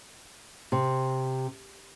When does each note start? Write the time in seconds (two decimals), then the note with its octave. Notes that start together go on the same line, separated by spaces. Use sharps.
0.72 C3